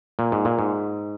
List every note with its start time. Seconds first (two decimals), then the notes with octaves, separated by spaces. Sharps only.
0.19 A#2
0.32 G#2
0.45 A#2
0.59 G#2